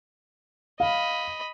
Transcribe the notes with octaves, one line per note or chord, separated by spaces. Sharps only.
D#5 F5 B5